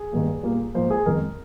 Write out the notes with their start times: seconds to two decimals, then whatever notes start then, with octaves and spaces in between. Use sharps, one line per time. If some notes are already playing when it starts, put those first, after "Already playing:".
Already playing: G#4
0.12 G2 D#3 G3 A#3
0.43 A#2 G3 A#3
0.74 G#2 F3 A#3 C5
0.91 G#4
1.06 F2 D#3 G#3 A#4